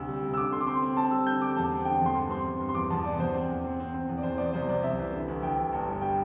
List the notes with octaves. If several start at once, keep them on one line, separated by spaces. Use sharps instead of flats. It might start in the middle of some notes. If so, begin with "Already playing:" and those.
Already playing: D2 C3 E6
G3
C3
E6
D3 D6
D3 C6
D6
C4 C6
C4
C4 A5
G3 E6
D3 G6
G3 D6
E2 A5
C4
D3 G5
E2 C6
G2
C4 C6
G2
G2
C6
E2 D6
E2 A5
C3 D5
E2 C5
C4
E2
C4
C4
C4
E2
D5
E2 C5
E2 D5
C2 C5
C2 D5
C2 E5
E3
D3
D2
D2 G5
D2
G1
G2
G3 G5